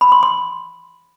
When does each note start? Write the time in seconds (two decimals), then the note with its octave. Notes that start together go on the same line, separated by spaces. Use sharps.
0.01 B5
0.12 C6
0.23 C6